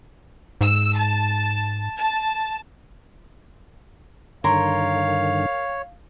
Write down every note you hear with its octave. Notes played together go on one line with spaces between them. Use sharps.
G#2 E6
A5
A5
G2 D3 D#3 A#4 C#5 F5 C6